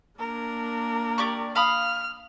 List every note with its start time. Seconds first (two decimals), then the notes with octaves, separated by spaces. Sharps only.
0.19 A#3 D4 A#4
1.18 G4 D5 C#6
1.56 F5 B5 D#6 F6